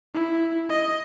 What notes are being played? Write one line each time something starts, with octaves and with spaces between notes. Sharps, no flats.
E4
D#5